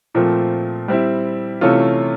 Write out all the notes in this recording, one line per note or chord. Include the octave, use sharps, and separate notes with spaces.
A#2 F3 A3 C4
G3 C4 E4
C3 E3 A3 C#4 F4